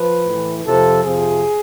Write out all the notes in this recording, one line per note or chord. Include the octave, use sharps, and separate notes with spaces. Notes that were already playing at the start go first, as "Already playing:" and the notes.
Already playing: F3 B4
A2 E3
F2 C3 F3 A4
F2 C3 F3 G#4